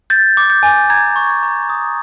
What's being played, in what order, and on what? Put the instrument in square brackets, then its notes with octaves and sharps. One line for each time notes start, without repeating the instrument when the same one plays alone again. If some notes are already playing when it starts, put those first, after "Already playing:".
[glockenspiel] G6 A6
D6
G6
G#5
A#5 G#6
C#6
A#5
D#6